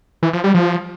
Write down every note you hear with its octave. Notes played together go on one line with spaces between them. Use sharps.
E3
F3
G3
F3